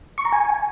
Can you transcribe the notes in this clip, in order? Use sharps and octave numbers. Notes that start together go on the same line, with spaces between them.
C#6
A#5
G#5